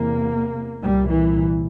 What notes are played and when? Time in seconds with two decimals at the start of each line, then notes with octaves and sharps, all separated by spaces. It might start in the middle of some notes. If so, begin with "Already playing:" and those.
Already playing: E2 C3 A#3
0.81 C2 A#2 G3
1.10 E3